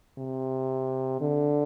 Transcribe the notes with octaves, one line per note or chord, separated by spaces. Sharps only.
C3
D3